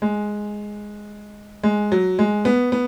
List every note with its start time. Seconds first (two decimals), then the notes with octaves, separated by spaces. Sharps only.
0.02 G#3
1.63 G#3
1.92 F#3
2.19 G#3
2.45 B3
2.72 B3